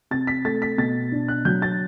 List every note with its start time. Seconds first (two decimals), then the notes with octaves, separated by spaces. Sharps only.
0.11 C3 A6
0.27 B6
0.45 A3 A6
0.62 B6
0.78 B2 A6
1.12 D4
1.28 F#6
1.45 F#3 G6
1.62 A6